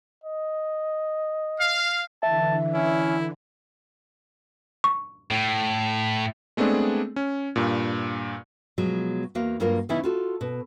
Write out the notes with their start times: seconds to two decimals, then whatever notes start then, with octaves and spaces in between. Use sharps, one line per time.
0.24 D#5
1.59 F5
2.23 D3 E3 E5 A5
2.74 C#4 E4
4.84 C#6
5.31 A2
6.57 G#3 A3 B3 C4 D4 G#4
7.16 C#4
7.56 G2 A#2
8.78 B2 F3 F#3 G#3
9.35 E2 A#3 F#4 F5
9.60 G2 F#3 A#3 F4 A#4 F5
9.89 C#3 E3 B3 C#4 D#4 E4
10.03 F4 F#4 A4
10.41 B2